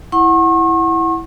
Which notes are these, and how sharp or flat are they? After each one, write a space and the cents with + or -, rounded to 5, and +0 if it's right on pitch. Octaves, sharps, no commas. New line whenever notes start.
E4 +0 F#5 +0 C#6 -40